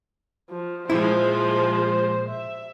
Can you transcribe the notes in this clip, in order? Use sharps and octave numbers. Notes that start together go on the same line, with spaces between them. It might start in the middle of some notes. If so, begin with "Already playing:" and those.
F3
A#2 F3 G#3 E4 C5
E5